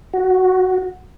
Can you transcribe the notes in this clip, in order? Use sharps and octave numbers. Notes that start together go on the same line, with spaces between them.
F#4